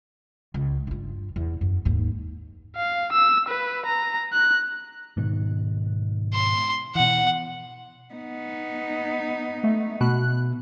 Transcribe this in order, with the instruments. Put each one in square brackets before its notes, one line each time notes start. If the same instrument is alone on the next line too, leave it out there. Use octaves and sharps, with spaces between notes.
[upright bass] C#2
G2 F4
E2
F#2
D#2 G#2
[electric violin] F5
E6
B4
A#5
F#6
[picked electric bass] G#2 B2 D#3
[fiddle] C6
[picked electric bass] B2 E3 [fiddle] F#5
[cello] B3 D#4
[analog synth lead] A3
[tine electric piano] B2 [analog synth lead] F#6